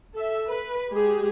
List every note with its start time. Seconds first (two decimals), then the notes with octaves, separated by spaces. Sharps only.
0.15 A4 E5
0.48 B4
0.89 G#3 G4 G#4